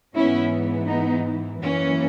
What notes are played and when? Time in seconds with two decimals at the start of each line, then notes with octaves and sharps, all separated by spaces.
0.15 G#2 E3 B3 C#4 E4
0.88 B3 D#4
1.62 F#2 E3 A#3 C#4